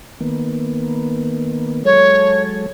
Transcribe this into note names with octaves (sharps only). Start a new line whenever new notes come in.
D#3 A#3 B3
F#3 G#3 A4 C#5